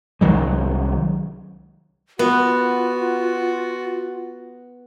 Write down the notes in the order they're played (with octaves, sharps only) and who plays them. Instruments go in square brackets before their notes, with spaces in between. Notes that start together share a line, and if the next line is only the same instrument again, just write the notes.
[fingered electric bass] C2 D#3 F#3 G#3
[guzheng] B3 [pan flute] F4 [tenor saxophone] F#4